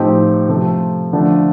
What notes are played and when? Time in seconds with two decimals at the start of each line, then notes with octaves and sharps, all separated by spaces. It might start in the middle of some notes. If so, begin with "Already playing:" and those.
Already playing: A2 F3 C4 D#4 G4
0.49 C3 F3 A3
1.13 D3 F3 A3 D4